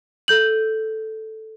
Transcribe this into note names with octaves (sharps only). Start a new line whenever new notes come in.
A4 G6 F#7